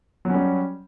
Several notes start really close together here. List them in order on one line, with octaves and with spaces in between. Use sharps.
F#3 C#4 G3